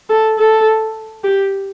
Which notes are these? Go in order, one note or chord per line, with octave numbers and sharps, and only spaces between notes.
A4
A4
G4